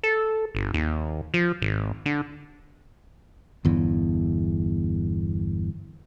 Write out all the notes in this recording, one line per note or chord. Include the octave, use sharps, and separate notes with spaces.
A4
G1
D#2
F3
G#1
D3
G1 E2